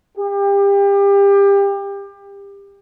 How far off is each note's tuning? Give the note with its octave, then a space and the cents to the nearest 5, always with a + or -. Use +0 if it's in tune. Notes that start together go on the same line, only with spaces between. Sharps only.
G4 +30